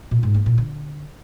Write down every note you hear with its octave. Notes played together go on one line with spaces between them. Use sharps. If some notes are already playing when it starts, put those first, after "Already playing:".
A#2
G#2
A#3
A#2
D3